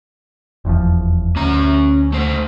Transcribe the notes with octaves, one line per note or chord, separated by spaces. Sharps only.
F1 E2 F3
D2 C#4 A#5
A3 C5